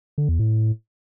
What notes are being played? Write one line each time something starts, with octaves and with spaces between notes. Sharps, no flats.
D3
E2
A2